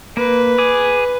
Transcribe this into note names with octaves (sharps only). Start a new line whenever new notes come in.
A#3 B4
G#4 D6